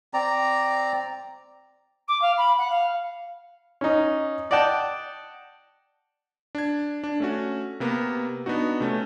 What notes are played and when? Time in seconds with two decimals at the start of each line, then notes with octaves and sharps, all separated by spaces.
0.14 C4 D5 A#5
2.08 D6
2.21 F5
2.37 B5
2.58 F#5
2.70 F5
3.81 C#4 D#4
4.51 D5 D#5 F#5 G5 A5
6.55 D4 G#6
7.04 D4
7.20 A3 C#4 F#4
7.80 C3 A#3 B3
8.46 B3 D4 D#4 F#4
8.80 C3 A3 C#4